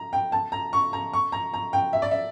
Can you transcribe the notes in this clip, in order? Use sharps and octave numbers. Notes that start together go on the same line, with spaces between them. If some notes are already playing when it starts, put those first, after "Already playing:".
Already playing: A#5
G5
A5
A#5
C#6
A#5
C#6
A#5
A#5
G5
E5
D5
E5